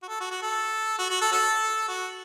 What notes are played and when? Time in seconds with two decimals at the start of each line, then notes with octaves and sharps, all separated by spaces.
0.02 F#4
0.08 A4
0.20 F#4
0.31 F#4
0.42 A4
0.98 F#4
1.10 F#4
1.21 A4
1.32 C#4 F#4 A4
1.88 F#4